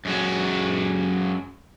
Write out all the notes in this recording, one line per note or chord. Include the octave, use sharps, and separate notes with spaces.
F#2 G#3 F#4